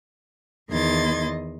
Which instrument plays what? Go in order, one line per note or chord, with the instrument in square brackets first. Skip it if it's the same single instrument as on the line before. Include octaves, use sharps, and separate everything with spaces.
[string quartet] E2 D#3 D#5 C6 G#6 A6